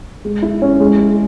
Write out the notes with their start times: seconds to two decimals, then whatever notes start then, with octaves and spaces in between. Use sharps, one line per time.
0.25 G#3
0.43 E4
0.62 C#4
0.80 G#3
1.00 G#4